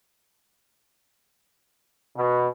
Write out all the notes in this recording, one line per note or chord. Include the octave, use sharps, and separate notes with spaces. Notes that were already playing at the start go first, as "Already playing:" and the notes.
B2